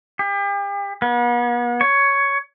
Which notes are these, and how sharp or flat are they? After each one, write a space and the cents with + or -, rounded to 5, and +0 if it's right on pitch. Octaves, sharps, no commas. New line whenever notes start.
G4 +40
B3 -40
C#5 +10